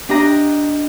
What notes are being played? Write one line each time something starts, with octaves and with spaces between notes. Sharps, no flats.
D4 G4 D#5 A#5